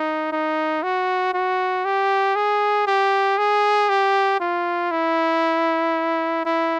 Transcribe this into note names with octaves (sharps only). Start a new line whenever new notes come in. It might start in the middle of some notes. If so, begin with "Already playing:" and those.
Already playing: D#4
D#4
F#4
F#4
G4
G#4
G4
G#4
G4
F4
E4
E4